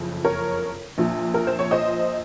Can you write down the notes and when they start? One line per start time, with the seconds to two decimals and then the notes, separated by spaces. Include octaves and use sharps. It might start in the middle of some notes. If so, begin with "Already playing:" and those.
Already playing: F#1 F2 C#3 F3
0.24 A#4 C#5
0.98 A#1 A#2 F3
1.34 A#4
1.47 C5
1.59 C#5
1.71 C5 D#5